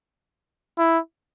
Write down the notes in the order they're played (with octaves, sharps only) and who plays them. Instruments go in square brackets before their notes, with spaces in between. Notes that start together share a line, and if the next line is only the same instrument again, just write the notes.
[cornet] E4